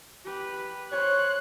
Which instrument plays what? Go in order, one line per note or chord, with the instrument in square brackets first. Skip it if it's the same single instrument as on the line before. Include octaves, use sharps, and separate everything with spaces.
[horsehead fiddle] G4 B4
[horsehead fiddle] C5 [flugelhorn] C#5 [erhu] F#6